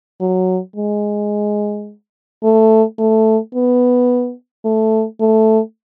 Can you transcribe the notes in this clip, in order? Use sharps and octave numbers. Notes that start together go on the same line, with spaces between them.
F#3
G#3
A3
A3
B3
A3
A3